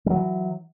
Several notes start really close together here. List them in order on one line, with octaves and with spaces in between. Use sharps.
G3 F#3 E3